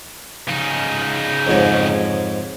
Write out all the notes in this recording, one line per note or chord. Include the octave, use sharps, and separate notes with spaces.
C#3 D#4
F2 G#2 C#5